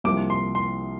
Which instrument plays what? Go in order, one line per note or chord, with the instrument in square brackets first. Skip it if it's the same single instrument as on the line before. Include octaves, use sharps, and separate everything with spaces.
[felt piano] C2 C3 F3 A#3 F4 [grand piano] D6
[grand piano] C6
C6